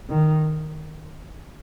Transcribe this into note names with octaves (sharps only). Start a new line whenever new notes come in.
D#3